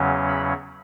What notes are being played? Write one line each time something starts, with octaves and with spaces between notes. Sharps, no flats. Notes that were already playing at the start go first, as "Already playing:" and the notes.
Already playing: E2 C#3 F#3 C#4
B5